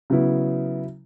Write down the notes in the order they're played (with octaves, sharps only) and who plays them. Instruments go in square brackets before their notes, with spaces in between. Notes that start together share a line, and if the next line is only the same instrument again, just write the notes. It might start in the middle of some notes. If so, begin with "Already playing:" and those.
[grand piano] C#3 F#3 B3 E4